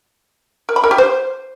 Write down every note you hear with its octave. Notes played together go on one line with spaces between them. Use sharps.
A#4
B5
A#4
G4
C5